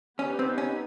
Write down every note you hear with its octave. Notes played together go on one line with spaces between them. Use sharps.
B3 C#4 D#4 G4 B4
C4
C#4